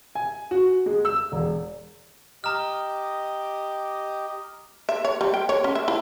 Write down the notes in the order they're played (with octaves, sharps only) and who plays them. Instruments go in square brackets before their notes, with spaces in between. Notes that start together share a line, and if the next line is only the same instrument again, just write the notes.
[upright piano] G#5
F#4
G#3
E6
E1
[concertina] G4 D#5 [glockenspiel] A#5 F6
[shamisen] E5
C#5
G3
G5
C#5
C#4
E5
E4